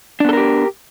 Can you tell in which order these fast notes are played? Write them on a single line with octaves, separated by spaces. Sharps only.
D4 B3 A4 A#4 G4